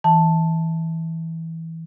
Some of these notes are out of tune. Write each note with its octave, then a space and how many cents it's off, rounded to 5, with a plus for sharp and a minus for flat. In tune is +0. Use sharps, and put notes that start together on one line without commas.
E3 -15 A5 +0